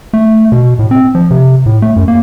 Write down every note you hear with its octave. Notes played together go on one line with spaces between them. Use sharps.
A3
B2
A2
C4
F3
C3
A2
A3
F#2
A#3